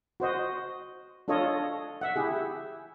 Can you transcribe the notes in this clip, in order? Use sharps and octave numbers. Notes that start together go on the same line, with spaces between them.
F#4 C5 D#5
D4 F4 A4 C#5 D#5
E5 F#5
E4 G4 G#4